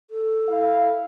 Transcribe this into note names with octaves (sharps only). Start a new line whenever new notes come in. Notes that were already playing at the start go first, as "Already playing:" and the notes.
A4
E4 F5